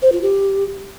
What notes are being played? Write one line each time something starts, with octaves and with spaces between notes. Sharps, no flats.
C5
F4
G4